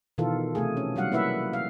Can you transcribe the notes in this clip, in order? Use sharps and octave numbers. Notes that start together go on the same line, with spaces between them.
B2 D#3 E3 F4 A4
C3 A3 G#4
C#4
F#3 G3 F5 F#5
A#3 E4 B4 E5 F#5
F5